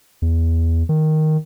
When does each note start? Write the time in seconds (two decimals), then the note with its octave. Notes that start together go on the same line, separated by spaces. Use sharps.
0.22 E2
0.89 D#3